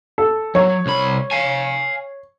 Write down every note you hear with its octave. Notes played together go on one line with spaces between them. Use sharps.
A4
F#3 C#5
C2 B5
F5 G#5